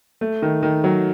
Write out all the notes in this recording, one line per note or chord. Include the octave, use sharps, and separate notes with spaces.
A3
D#3
D#3
F#3